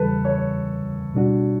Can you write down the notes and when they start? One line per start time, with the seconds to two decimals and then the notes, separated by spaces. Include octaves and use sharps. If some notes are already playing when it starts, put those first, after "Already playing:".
Already playing: E2 C#3 E3 G3 A4 B4
0.25 C#5
1.14 B2 G3 D4 F#4